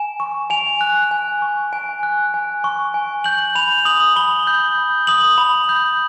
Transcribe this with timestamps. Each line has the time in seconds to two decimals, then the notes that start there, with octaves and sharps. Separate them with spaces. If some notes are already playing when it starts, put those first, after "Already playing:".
Already playing: G#5 E7
0.20 C#6
0.50 G#5 F7
0.81 F#6
1.11 G#5
1.42 C#6
1.73 G#5
2.03 F#6
2.34 G#5
2.64 C#6
2.94 G#5
3.24 G6 F#7
3.55 B5 F7
3.85 D#6 F#7
4.16 B5 G7
4.47 G6
4.78 B5
5.07 D#6 F#7
5.38 B5
5.69 G6